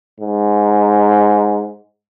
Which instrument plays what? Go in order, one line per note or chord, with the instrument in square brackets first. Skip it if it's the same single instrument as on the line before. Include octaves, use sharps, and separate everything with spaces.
[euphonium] G#2